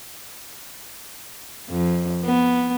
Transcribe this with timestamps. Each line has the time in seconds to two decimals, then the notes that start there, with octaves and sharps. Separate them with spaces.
1.71 F2
2.25 B3